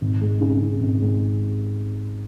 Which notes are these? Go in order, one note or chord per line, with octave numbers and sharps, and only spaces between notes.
G#1
G#3
C#3
C#3
G#1
G#3